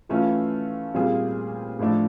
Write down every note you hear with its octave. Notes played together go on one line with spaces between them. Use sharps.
E3 A3 C#4 F4
A#2 G3 C4 F4 G#4
A2 F3 A3 D4